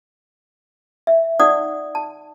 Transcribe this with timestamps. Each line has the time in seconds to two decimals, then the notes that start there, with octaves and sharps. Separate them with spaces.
1.07 E5
1.40 D#4 D5 F#5 D#6
1.95 A5